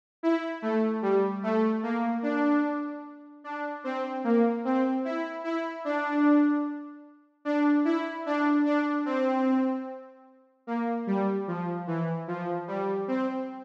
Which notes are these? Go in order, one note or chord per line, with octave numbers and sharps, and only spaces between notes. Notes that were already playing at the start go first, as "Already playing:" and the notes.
E4
A3
G3
A3
A#3
D4
D4
C4
A#3
C4
E4
E4
D4
D4
E4
D4
D4
C4
A#3
G3
F3
E3
F3
G3
C4